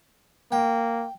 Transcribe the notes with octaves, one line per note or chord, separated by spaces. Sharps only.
A#3 G5